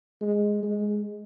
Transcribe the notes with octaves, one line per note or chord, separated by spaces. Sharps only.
G#3
G#3